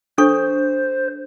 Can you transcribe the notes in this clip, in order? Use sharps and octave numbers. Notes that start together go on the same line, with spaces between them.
D4 A4 C5 C#6